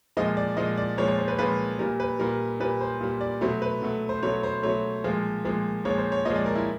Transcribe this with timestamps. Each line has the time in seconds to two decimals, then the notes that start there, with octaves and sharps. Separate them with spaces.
0.17 A#2 F3 G#3 D#5
0.37 D5
0.57 A#2 F3 G#3 D#5
0.77 D5
0.98 A#2 F3 G#3 C#5
1.08 C#5
1.18 C5
1.28 B4
1.39 A#2 F3 G#3 B4
1.79 A#2 G3 A#4
2.00 B4
2.19 A#2 G3 A#4
2.60 A#2 G3 B4
2.81 C5
3.01 A#2 G3
3.21 D5
3.41 B2 F#3 A3 C5
3.62 B4
3.82 B2 F#3 A3
4.09 C5
4.23 B2 F#3 A3 C#5
4.43 C5
4.63 B2 F#3 A3 C#5
5.04 A#2 F3 G#3
5.45 A#2 F3 G#3
5.85 A#2 F3 G#3 C#5
5.98 C5
6.12 C#5
6.25 A#2 F3 G#3 D#5
6.36 D5
6.46 A#4
6.55 E4